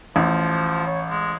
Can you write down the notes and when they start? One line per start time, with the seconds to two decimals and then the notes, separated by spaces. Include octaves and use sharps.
0.16 A1 F3
0.87 C#5
1.10 G#3